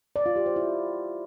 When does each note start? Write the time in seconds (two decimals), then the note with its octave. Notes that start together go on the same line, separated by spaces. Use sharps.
0.16 D5
0.26 F4
0.36 G4
0.46 C5
0.56 E4